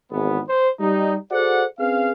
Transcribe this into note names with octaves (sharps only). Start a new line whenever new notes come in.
G#1 E2 B3
C5
G3 D#4
F#4 G#4 A4 C5 D5 F#5
C4 C#4 G#4 B4 F5